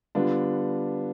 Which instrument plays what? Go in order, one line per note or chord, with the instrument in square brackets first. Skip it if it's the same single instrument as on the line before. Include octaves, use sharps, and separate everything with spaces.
[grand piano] D3 G3 B3 D4 F4